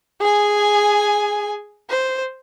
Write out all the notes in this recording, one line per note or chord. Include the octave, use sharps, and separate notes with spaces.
G#4 G#5
C5